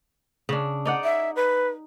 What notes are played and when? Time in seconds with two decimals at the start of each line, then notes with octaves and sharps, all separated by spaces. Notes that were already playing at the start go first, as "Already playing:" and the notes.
0.49 C#3 D4
0.85 D#4 D5 F#5
1.04 E5
1.36 B4